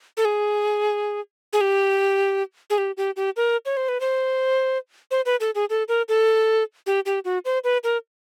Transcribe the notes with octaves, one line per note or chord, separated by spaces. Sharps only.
A4
G#4
G#4
G4
G#4
G4
G4
G4
A#4
C#5
C5
B4
C5
C5
B4
A4
G#4
A4
A#4
A4
G4
G4
F#4
C5
B4
A#4